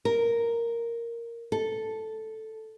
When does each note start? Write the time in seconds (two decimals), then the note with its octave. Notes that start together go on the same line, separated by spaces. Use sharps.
0.05 A#4
1.52 A4